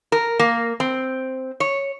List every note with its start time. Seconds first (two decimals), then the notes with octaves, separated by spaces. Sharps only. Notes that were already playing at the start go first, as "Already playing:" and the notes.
0.12 A#4
0.39 A#3
0.80 C4
1.60 C#5